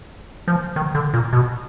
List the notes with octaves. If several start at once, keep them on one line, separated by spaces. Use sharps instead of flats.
F3
D#3
D3
A#2
B2